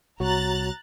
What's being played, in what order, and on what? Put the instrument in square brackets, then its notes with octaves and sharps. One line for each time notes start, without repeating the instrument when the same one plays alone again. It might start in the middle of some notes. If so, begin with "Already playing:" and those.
[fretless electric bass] C2 [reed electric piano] F#4 C#5 [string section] A#5 F#6 A6